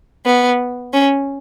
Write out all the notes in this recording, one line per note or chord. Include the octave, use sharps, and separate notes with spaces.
B3
C#4